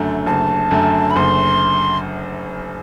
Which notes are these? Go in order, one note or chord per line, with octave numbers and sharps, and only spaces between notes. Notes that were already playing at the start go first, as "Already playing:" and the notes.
Already playing: F#1 F#2 D3 A3
F#1 A5
F#2 D3 A3
B5
F#1 C6